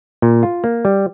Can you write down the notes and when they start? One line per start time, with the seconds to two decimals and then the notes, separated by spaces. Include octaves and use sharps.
0.22 A#2
0.43 F4
0.64 A#3
0.85 G3